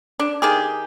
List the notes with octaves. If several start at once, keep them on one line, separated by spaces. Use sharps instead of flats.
D4
D#3 G4 G#4